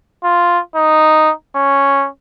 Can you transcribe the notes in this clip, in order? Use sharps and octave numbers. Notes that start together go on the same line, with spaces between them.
F4
D#4
C#4